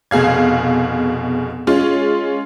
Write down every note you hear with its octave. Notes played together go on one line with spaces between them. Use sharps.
F1 B2 G#4 F5 G#6
G#3 C#4 F4